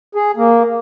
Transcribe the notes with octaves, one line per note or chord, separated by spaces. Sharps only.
G#4
A#3